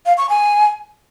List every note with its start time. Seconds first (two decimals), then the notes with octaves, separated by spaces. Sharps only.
0.06 F5
0.18 C#6
0.29 G#5